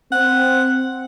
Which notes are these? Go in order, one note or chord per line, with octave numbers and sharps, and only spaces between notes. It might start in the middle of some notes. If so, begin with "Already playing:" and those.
C4 F#5